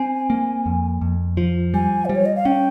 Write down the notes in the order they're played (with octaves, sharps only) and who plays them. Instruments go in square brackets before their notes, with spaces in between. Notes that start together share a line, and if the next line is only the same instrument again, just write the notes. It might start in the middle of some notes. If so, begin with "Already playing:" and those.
Already playing: [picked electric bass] C4 [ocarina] G#5
[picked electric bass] A#3
F2
F2
F3
[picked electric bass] G3 [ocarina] G#5
[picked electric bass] G3 [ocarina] C5
[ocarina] C#5
D#5
F5
[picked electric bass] C#4 [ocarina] G5